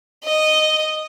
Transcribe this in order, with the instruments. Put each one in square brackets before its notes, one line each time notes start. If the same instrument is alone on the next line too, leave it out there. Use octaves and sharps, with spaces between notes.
[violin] D#5